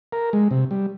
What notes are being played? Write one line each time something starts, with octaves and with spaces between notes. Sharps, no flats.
A#4
G#3
C3
G3